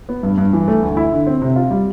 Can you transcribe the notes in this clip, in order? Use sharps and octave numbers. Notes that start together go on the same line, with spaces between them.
B3
G2
G2
E3
A3
D2
E4
D3
C4
C3
F4
G3